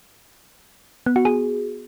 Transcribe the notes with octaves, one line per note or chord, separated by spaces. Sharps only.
B3
F#4
G#4